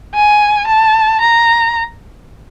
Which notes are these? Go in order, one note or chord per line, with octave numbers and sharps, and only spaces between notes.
G#5
A5
A#5